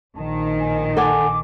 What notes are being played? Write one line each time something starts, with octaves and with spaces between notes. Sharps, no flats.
A#1 D#3 A5
G#5
A4 F#5 G#5 D6